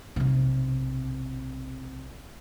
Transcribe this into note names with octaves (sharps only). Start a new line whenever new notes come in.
B1 C3